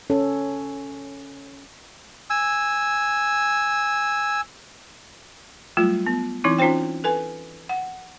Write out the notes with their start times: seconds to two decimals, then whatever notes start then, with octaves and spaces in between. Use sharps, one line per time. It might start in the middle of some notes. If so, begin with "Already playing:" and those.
0.10 C#4 A4
2.30 G#5 E6
5.77 F#3 G3 A3 F4
6.07 B3
6.44 E3 C4 D#4 E4
6.58 C#4 D#4 F4 C5 G5
7.04 A4 B4 G#5
7.69 F#5